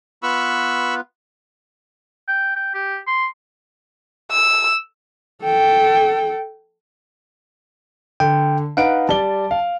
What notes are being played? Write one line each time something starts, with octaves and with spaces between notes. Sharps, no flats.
B3 F4 B4 B5 C#6 E6
G5
G5
G4
C6
E6
A4 G5
D3 G5
D#4 B4 F5 F#5 D7
G3 D5 A5 G7
F5